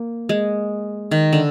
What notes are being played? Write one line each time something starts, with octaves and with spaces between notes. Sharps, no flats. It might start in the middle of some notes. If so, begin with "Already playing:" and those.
Already playing: A#3
G#3
D#3
D3